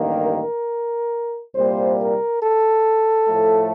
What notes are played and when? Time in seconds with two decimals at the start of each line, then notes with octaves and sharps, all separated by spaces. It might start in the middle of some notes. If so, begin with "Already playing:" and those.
Already playing: A1 G2 D#3 A#3
0.26 A#4
1.55 C2 A#2 G3 A#3 C5
1.99 A#4
2.42 A4
3.28 A2 F3 A3